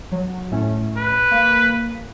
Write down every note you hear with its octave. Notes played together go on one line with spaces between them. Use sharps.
F#3
A2 A3 C#4
B4
A#3